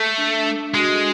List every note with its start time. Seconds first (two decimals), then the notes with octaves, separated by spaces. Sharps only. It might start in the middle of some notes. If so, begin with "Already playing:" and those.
Already playing: A3 A4
0.18 D4
0.46 D4
0.74 G#3 F#4